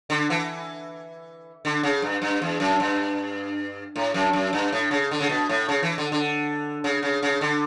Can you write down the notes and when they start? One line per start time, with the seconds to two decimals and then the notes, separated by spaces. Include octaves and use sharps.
0.10 D3
0.30 E3
1.65 D3
1.83 C#3
2.02 G2
2.22 G2
2.42 E2
2.60 F#2
2.80 G2
3.96 A2
4.14 F#2
4.33 F#2
4.53 G2
4.72 A2
4.91 C#3
5.11 D3
5.21 C#3
5.29 B2
5.49 A2
5.69 C#3
5.83 E3
5.98 D3
6.12 D3
6.84 C#3
7.03 C#3
7.23 C#3
7.41 D3